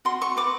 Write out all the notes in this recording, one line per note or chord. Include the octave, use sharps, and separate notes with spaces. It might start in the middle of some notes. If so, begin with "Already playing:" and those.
F#4 C6
F#4 C#6
B4 D6